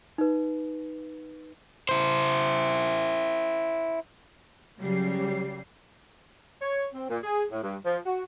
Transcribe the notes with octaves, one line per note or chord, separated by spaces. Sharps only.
D#4 B4
E4 C5
C#3 F#3 G3 C7
C#5
C4
A#2
G#4
A2
G2
F3
F#4